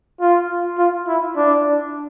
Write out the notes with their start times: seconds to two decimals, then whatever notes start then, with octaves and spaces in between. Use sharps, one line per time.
0.21 F4
0.78 F4
1.07 E4
1.36 D4